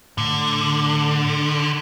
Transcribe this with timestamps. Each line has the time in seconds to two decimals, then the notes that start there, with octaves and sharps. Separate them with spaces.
0.18 A2 D3